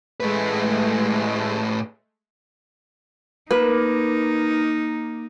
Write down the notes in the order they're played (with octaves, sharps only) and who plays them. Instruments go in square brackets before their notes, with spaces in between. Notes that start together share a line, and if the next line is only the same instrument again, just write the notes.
[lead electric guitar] A2 B4 [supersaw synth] G#3 A3
[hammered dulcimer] A#3 [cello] D#4 [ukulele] B4